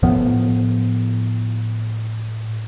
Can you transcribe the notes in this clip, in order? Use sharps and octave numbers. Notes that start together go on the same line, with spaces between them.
A2 F3 B3